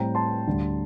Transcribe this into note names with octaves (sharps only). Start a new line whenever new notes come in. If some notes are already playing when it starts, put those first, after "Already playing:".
Already playing: A2 G3 C4 G5 A#5
A5 C6
D2 D3 G3